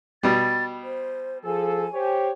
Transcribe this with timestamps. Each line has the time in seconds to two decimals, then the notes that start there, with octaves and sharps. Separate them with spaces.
0.23 B2 G3 A6
0.83 C5
1.45 F3 G#4 A4 G#5
1.93 G4 C5 C#5